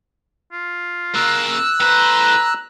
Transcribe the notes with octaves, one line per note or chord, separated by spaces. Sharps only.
F4
C#3 A#3 A#4 E6 F#6
A2 B4 C5 A#5